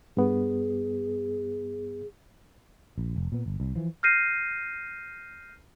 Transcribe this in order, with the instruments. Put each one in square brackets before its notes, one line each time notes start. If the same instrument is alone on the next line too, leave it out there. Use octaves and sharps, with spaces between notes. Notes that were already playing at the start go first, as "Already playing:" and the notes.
[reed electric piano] G2 B3 [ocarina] G#4
[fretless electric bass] A#1
F1
A#2 B3
G1
C2
E3 F3
[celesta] F6 G6 A#6 C7 D#7